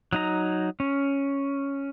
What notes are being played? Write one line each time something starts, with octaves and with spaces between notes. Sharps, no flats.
F#3 D#4 A#5
C#4